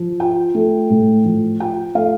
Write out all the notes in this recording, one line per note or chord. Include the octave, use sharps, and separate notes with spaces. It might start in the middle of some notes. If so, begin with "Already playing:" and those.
Already playing: F3
F4 G5
A3
A2
F3
F4 G5
A3 F5